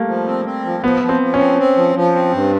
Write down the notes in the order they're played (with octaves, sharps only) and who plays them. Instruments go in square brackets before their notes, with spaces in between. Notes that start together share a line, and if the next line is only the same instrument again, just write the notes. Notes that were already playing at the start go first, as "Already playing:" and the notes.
Already playing: [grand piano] G3 A3 A#3
[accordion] F3
C4
C4
F3
[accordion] F3 [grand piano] B3
[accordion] F3
[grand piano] C4
[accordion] F3
[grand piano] C#4
[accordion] C4
C4
F3
F3
C4
G2